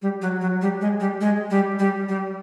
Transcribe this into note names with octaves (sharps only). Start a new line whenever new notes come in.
G3
F#3
F#3
G3
G#3
G3
G#3
G3
G3
G3